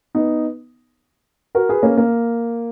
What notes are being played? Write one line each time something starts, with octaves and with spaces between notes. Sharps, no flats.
B3 D#4
F#4 A#4
G#4 B4
A#3 C#4
A#3